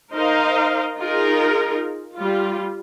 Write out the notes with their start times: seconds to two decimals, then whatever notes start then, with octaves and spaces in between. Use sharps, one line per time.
0.13 D#4 A#4 C5 D#5 F5
0.97 D#4 F4 G#4 A#4
2.17 G3 F4